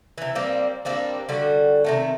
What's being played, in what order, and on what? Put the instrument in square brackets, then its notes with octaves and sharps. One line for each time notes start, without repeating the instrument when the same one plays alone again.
[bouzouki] C3 E3
G3 A#3 C4
G3 A#3 C4 D4
D3 G3 F#4
C3 D#3 A3